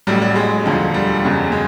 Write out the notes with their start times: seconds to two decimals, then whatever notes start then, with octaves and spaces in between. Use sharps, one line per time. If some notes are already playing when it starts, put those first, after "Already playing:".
0.07 A1 A2 F#3 G3
0.22 G3
0.36 G#3
0.66 E1 D2 D3 F3
0.94 G3
1.23 F#1 E2 C#3 F#3
1.52 G#3